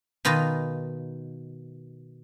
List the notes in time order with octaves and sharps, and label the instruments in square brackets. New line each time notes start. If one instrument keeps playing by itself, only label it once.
[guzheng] B2 D#3 F4 B4 D#5